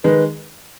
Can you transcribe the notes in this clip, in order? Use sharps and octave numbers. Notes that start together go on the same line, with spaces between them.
D#3 G#3 B4